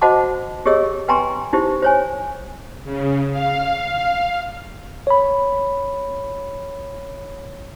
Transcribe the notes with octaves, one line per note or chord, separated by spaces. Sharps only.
F#4 C5 D#5 F#5 A5 D6
G4 G#4 C#5 D#5 E6
B4 G5 G#5 A#5 C6 C#6
D#4 E4 G4 C5
C5 C#5 G#5
C#3
F5
C#5 B5